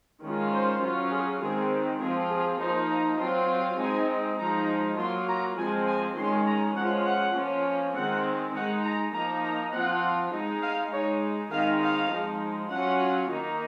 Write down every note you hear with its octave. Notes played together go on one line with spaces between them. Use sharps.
D#3 G#3 C#4 F4
C5
F#3 C#4 F4
G#4
D#3 G#3 C4 G#4
F3 C4 F4 G#4
G#4
F3 A#3 D#4 C5
A#5
F#3 C4 F4 C6
G#3 C4 D#4 G#5
F3 G#3 D#4 A#5
F#3 A#3 F4 C6
A#5
F3 G#3 C4 G#5
G#5
D#3 G#3 C#4 C6
A#5
F3 G#3 C#4 F4 F#5
F#5
F3 A#3 C#4 F4
D#3 G#3 C4 F#5
G#3 D#4 F#5
A#5
F3 A#3 D#4 A#5
A#5
F3 C4 F4 F#5
G#3 D#4
F5
G#3 D#4 C#5
D#3 G#3 C4 D#4 F5
F5
F3 G#3 D#4
F#3 C#4 F4 F#5
D#3 A#3 D#4